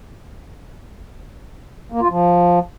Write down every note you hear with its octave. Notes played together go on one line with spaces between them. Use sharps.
A#3
F4
F3